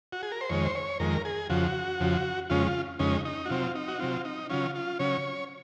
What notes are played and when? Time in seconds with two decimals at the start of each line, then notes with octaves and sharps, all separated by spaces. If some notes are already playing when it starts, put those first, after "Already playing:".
0.13 F#4
0.23 G#4
0.32 A#4
0.41 C5
0.49 F2 D#3 G#3 C#5
0.65 C5
0.75 C#5
1.00 F2 D#3 G#3 A#4
1.25 G#4
1.50 F2 C#3 F3 F#4
2.00 F2 C#3 F3
2.50 F2 C#3 G#3 C#4 F4
2.67 F4
2.99 F2 C#3 G#3 C#4 D#4
3.25 D#4
3.46 F#4
3.49 C3 F#3 C4 F4
3.75 D#4
3.88 F#4
3.99 C3 F#3 C4 F4
4.25 D#4
4.50 C#3 F#3 C#4 F4
4.75 F4
4.99 C#3 F#3 C#4 C#5